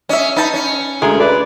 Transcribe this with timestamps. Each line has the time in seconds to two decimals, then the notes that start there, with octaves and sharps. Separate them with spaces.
0.09 C#4 D#5 E5
0.36 D#4 B4 A5 B5
0.54 C#4
1.02 D2 G#3 A#4 G#5
1.20 B4 D5